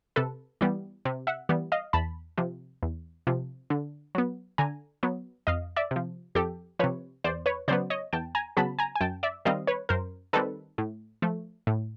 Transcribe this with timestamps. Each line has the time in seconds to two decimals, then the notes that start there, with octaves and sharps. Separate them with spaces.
0.16 C3 A4 B4
0.61 E3 G3 B3
1.05 C3
1.27 E5 F#5
1.49 E3 G3 B3
1.72 D#5 F5
1.93 E2 A5 B5
2.38 C3 F3
2.83 E2
3.27 C3 F3
3.70 D3
4.15 F#3 B3
4.58 D3 G#5 A#5
5.03 F#3 B3
5.47 F2 D#5 F5
5.76 D5 E5
5.91 C3
5.96 F3
6.35 F2 G4 A4
6.79 C3 F3 B4 C#5
7.24 E2 C5 D5
7.46 B4 C#5
7.68 C#3 F#3 B3 C5 D5
7.90 C#5 D#5
8.13 E2 G5 A5
8.35 G#5 A#5
8.57 C#3 F#3 B3 A5 B5
8.79 G#5 A#5
8.96 G#5
9.01 F#2 G5 A5
9.23 D5 E5
9.45 D#3 G3 C4 D#5 F5
9.67 B4 C#5
9.89 F#2 A#4 C5
10.33 D#3 G3 C4 A4 B4
10.78 A2
11.22 F3 A3
11.67 A2